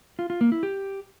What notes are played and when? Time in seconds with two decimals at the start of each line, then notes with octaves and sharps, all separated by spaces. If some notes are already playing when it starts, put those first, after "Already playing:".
0.19 F4
0.30 F4
0.41 A#3
0.52 E4
0.63 G4